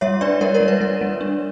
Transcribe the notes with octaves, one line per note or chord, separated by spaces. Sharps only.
G3 C#5 E5
D4 B4 D5
G3 A#4 C#5
A#4 C#5
G3
B4
G3 A#4
G3
D4